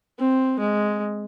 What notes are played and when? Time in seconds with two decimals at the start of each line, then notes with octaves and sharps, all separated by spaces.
0.19 C4
0.59 G#3